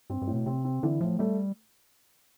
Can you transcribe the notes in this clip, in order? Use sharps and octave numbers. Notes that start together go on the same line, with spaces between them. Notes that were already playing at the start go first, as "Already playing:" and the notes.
G2 C4
G2
A2
B2
C3 C4
C4
D3 E3
A2 F3
G3 A3